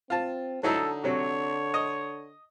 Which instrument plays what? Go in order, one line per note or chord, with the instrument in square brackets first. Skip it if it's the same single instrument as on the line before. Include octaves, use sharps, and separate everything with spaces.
[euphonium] C4 [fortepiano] F4 A5
[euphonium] D3 [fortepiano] F#3 D#4 E4 [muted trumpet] A4
[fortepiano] C3 F#3 [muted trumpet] C#5
[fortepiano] D#5